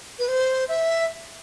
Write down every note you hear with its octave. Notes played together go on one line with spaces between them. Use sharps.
B4
C5
E5